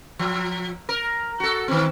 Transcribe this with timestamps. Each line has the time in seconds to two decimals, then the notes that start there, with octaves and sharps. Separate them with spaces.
0.19 F3
0.89 A#4
1.40 F#4 A4
1.68 D#3 C4